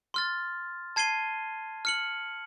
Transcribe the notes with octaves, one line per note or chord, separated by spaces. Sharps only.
C6 F6 A6
A5 G#6 C7 D#7 G7
F6 C#7 F#7